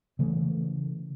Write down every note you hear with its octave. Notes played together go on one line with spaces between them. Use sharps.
C#3 E3 A3